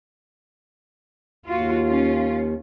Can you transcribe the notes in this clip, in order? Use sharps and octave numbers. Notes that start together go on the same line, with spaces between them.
D#2 F4 F#4
C#4 F4